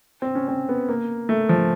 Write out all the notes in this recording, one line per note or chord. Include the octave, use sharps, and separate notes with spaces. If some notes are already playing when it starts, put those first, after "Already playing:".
C4
C#4
C4
B3
A#3
A3
F3